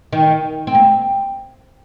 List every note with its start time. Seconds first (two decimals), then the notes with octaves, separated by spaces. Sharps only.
0.13 D#3
0.67 C4
0.75 A#3